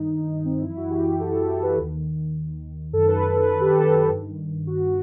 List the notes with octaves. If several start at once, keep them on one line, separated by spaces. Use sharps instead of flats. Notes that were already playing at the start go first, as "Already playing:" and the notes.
Already playing: G2 D#3 D#4
C4
D#4
F#2 E3 E4
F#4
G4
G4
A4
G4
A4
B4
D#2 D#3
F#2 D#3 A4
B4
B4
B4
G4
A4
A4
A4
G2 D#3
F#4
F#4